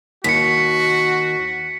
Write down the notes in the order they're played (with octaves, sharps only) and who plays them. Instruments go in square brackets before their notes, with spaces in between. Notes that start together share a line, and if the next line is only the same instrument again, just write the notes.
[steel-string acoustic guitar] D#2 [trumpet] F#4 [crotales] B6 C#7